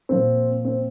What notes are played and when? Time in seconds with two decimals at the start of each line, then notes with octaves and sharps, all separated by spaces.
0.09 A#2 F3 C4
0.65 C4